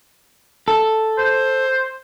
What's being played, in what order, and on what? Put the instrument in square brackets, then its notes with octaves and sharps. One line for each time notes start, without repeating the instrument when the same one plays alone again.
[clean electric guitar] A4
[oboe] C5